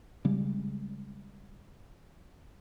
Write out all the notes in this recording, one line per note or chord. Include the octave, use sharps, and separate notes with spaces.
C#3 G3 G#3